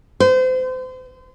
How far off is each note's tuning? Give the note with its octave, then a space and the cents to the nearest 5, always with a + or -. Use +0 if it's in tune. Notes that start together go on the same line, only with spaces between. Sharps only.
C5 -35